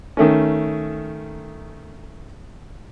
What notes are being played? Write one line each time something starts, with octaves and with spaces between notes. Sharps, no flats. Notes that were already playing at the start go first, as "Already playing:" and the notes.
D#3 A3 C#4